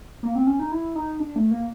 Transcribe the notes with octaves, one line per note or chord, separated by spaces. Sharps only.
A#3
C4
C#4
D#4
E4
D#4
D4
A3
A#3